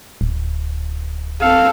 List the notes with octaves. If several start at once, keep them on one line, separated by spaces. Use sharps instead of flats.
D1
C4 A4 F5